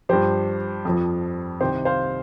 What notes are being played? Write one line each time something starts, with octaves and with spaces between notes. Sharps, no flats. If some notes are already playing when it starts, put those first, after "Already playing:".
G2 F3 G4 C5
F2 F3
C2 C3 D#3 G4 C5
C5 F5